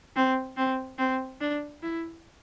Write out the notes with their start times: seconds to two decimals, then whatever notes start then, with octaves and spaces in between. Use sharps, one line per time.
0.16 C4
0.57 C4
0.98 C4
1.40 D4
1.82 E4